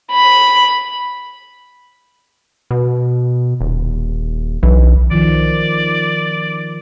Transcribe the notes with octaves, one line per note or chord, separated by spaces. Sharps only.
B5
B2
D#1
B1 E3
D#3 F3 D5